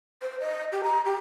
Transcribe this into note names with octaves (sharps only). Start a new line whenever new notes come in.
C5
D#5
G4
A#5
G4